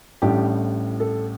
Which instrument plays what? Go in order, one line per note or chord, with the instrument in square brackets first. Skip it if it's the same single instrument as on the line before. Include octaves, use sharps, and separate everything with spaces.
[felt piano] A1 A2 G3 D4 G4
A4